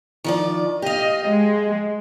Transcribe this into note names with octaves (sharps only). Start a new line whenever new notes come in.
D#3 F3 D5
G4 D#5 F5
G#3